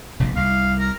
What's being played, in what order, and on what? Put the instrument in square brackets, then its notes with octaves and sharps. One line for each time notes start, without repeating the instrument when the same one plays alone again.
[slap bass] F1 A#1 G#2
[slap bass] C2 [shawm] F5
[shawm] A#4